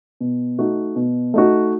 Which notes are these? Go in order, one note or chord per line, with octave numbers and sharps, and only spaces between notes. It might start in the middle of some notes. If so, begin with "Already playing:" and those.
B2
A3 D#4 F#4
B2
A3 D#4 F#4